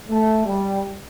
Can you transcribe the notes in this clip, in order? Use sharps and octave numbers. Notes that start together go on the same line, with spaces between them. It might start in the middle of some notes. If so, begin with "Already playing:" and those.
A3
G3